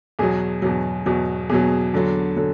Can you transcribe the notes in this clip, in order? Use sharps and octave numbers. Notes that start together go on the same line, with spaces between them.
E2 B2 F#3 G#4
E2 B2 F#3
E2 B2 F#3
E2 B2 F#3 G#4
E2 D3 F#3
D3 F#3